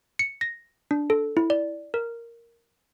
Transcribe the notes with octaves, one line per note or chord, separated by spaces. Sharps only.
C#7
A#6
D4
A4
E4
D5
A#4